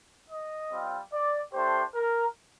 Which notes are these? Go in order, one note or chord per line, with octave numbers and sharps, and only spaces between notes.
D#5
G3 C4 F4
D5
A3 D4 G4 C5
A#4